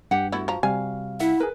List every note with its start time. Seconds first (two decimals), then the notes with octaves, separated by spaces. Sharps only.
0.11 G2 G4 F#5
0.32 A3 B3 E4 F#4
0.48 F3 A#5
0.63 C3 G3 F5 G#5
1.20 E4 E5 F#5
1.40 G#4 A#4 B4